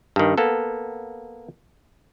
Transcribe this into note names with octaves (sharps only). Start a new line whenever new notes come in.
G2 D#3
A#3 B3 A4